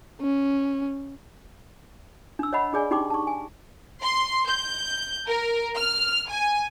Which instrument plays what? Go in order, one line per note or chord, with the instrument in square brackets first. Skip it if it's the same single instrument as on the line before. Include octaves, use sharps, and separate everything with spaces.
[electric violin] C#4
[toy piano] D4 E6
C#5 D#5 F#5 B5
D4 G#4 D5 G#5
D4 D#4 G4 G5 C6 D6
A5 C#6
G#5
[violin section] C6
G6
A#4
F6
G#5